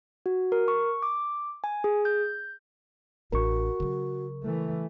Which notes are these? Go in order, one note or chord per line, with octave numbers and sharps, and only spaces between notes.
F#4
A#4
C#6
D6
G#5
G#4
G6
A1 D4 F#4 A#4 C#6
C#3 F#3
E3 A3